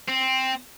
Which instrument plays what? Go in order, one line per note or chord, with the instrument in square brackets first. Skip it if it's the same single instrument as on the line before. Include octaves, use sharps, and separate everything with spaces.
[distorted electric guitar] C4